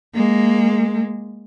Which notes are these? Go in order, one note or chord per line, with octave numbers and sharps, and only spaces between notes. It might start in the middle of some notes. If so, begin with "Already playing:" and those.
G#3 A#3